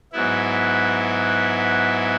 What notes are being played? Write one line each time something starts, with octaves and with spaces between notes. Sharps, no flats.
G#2 F#3 B3 E4